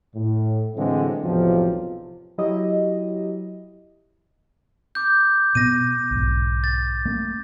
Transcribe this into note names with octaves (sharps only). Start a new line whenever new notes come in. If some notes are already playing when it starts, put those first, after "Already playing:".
A2
A2 D3 E3 F#3 G#3 C4
B1 E2 A2 C3 F3
F#3 E4 G4 D#5
D6 G6
B2 B3 A#6 D#7
B1 E2 G#2
A6
A3 A#3 C#4